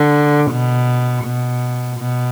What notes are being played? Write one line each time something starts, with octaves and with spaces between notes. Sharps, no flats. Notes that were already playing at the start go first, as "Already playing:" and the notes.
Already playing: D3
B2
B2
B2